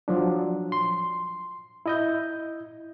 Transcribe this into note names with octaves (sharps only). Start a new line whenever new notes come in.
F3 F#3 D4
C6
E4 D#5 G6